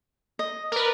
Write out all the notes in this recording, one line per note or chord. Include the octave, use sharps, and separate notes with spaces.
D#5
A#4 B4 D5